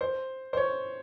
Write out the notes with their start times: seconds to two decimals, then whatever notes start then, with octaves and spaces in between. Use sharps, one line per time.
0.01 C5
0.53 C5
0.57 C#5